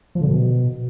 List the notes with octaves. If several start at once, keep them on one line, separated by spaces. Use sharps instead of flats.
F3
D3
B2